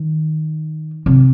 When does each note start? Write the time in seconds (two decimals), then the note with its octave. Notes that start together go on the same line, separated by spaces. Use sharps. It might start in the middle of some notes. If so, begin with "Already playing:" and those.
Already playing: D#3
1.06 C3